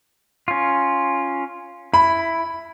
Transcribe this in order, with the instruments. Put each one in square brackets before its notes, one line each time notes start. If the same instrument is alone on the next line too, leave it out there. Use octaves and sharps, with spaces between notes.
[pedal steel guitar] C#4 F4
[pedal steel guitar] E4 [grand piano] B5